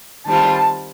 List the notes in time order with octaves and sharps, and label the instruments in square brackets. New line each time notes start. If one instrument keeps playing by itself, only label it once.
[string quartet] D#3 G3 C4 F4 [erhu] A5